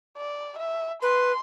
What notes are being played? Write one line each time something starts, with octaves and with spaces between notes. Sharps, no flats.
D5
E5
B4 C6